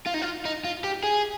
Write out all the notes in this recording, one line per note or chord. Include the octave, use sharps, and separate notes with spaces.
F4
D#4
F4
D#4
F4
G4
G#4